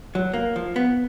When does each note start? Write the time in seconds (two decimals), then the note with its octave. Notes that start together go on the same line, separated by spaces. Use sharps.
0.15 F#3
0.34 A#3
0.56 F3
0.76 B3